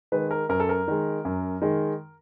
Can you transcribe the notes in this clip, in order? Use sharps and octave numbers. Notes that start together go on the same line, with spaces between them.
D#3 G#3 B4
A#4
F#2 A#4
A4
A#4
D#3 G#3
F#2
D#3 G#3